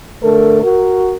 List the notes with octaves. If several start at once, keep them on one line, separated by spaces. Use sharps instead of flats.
D3 A3 A4 A#4
F#4 A#4